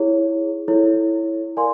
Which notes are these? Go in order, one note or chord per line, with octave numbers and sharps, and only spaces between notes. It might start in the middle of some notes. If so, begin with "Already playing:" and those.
Already playing: E4 G#4 C#5
E4 A4 C#5
A#4 D5 F5 G#5 C6